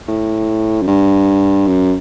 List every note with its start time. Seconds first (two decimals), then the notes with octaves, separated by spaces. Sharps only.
0.08 A2
0.82 F#2
0.88 G2
1.67 F#2